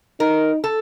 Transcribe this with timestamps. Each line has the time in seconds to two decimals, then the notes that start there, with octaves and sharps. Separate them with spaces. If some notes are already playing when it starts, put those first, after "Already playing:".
0.20 D#4 A#4
0.64 A4